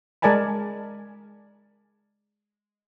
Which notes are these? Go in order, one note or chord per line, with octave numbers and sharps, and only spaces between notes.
G#3 A#4 D5 G#5 A5 B5